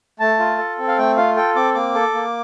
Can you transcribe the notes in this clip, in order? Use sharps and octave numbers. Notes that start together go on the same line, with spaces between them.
A3 A5
F4
A4
C4
F5
A3 G5
F4 F5
A4 G5
C4 D6
A#3 D6
A4
A#3